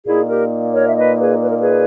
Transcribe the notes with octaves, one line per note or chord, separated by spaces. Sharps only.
A#2 A#3 D#4 E4 G#4
G4 A#4
A#4 C#5
E5
B4 D#5
G#4 B4
B4
A#4
G#4 B4